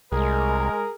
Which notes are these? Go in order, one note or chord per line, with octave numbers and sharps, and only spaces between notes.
C2 G#3 G#4 A#4